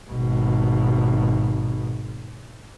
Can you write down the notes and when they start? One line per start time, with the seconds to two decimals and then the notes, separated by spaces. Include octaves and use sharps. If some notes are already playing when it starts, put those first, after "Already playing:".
0.10 G#1 B2